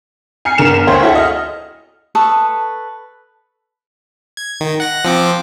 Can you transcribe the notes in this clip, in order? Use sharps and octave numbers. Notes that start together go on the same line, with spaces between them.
G#5 F6 C7 C#7
G1 D3 A#4 E7 F7
D2 C5 C#5
E4 F#4 A4
D#5 F6
A4 B4 C#6 D#6
G#6
D#3
F#5 A#6
F3 C4 D6